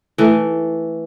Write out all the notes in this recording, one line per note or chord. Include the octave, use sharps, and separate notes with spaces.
E3 A3